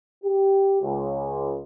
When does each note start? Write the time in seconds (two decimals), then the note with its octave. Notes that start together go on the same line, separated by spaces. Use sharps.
0.24 G4
0.82 C#2